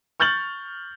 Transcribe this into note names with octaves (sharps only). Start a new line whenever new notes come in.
C#6 F6 G6 A6 F#7